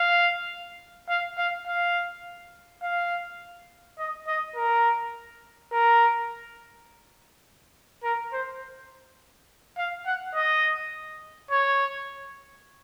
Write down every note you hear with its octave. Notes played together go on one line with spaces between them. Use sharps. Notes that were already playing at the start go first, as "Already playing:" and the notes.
Already playing: F5
F5
F5
F5
F5
D#5
D#5
A#4
A#4
A#4
C5
F5
F#5
D#5
C#5